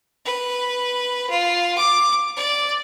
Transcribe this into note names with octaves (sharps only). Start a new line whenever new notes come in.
B4
F4
D6
D5